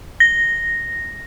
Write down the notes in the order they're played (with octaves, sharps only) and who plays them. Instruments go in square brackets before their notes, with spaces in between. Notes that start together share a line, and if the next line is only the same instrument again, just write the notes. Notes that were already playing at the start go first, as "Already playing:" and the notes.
[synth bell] A#6